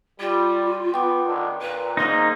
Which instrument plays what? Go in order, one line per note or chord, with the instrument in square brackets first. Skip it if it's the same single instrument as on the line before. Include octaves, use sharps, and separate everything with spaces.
[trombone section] G3 [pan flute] F4
[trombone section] B3 [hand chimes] G5 D6
[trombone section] A1 D3 D#3
[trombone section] A#2 [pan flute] B4
[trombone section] G#2 [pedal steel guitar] A#3 D#4 [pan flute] C6